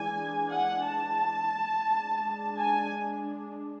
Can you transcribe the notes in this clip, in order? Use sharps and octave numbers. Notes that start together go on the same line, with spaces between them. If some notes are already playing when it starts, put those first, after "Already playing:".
Already playing: E3 G#3 D4 G#5
F#5
A5
G#3 D4
G#5